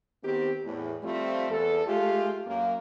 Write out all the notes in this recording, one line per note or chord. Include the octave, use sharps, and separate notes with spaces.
D#3 B3 C4 G4
E2 A2
F3 G3 A3 C4 F4
E2 A4
G#3 A3 F4 G4
F#2 A#3